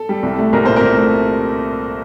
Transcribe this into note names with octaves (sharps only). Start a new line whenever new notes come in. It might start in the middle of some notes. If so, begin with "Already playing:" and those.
Already playing: A4
G3
C2
A3
C2 A#4
A#2 C5
C2 A#4
A3